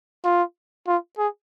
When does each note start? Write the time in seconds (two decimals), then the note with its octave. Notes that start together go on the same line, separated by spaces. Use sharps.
0.24 F4
0.87 F4
1.18 G#4